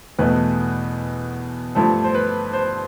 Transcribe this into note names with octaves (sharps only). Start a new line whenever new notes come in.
E2 B2 A3 B4
G2 F3 A3 A4
C5
B4
C5